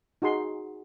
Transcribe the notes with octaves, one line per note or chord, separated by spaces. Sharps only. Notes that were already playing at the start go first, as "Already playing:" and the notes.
D#4 F#4 G#4 C6